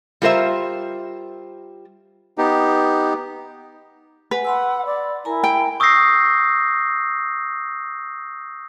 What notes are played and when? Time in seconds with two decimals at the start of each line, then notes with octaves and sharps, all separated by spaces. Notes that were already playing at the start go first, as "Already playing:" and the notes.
0.22 G3 F4 A#4 C5 E5
2.38 B3 D#4 G4
4.31 B4 F#5 G#5
4.45 F#5 B5 C6 E6
4.86 D5
5.25 E4 A#4 G#5 A#5
5.44 G5
5.80 C#6 D#6 E6 G6 A#6 C7